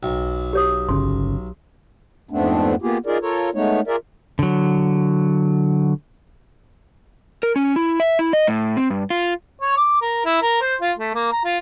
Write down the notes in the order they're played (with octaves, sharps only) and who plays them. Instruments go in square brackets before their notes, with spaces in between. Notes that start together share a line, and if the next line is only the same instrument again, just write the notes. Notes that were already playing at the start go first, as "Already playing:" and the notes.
[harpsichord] B1 [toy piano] G5
[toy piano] G4 C#5 D#6
[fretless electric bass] G1 C#3 [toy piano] C6
[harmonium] F2 G#2 A3 B3 C4 D4
A#3 B3 F4 G4 G#4
D#4 F4 G#4 A#4 D5
F4 A4 A#4 C#5
G#3 A3 B3 D#4 C#5
F4 G#4 A#4 D5 E5
[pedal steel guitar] D3 F#3
[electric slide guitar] A#4
C#4
E4
E5
E4
D#5
A2
C4
G2
F4
[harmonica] C#5
D6
A#4
E4
A#4
C5
F4
A3
A#3
A#5
F4